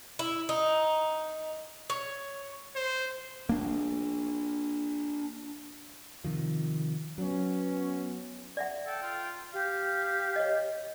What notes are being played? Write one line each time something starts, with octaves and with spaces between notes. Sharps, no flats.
E4
D#4
C#5
C5
A#3 D4
C3 D#3 F3
F#3 B3 C#4
D5 E5 F#5
A4 G5
F4
G4 F5
C#5 D#5